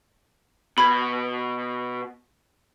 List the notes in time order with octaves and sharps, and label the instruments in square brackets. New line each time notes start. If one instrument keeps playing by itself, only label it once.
[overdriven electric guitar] B2 [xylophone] B5 G#6